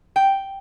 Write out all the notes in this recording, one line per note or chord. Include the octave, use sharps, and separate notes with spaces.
G5